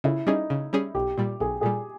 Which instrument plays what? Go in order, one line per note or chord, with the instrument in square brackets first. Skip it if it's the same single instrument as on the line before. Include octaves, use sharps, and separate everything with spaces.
[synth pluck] C#3 [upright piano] E4
[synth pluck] G3 C#4 G#4 [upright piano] D#4
[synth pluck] C#3
G3 C#4 G#4
[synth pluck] B1 [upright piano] G4
[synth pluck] A#2 G3
[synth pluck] B1 [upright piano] G#4
[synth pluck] A#2 G3 [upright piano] G#4